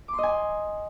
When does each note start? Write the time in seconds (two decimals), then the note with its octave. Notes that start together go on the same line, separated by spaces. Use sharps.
0.08 D6
0.13 C6
0.18 D#5
0.23 G#5